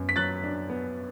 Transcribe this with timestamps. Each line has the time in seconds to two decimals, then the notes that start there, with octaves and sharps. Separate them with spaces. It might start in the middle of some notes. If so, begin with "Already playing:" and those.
Already playing: F#2 B3
0.09 B6
0.16 F#3 F#6 A6
0.44 D4
0.70 B3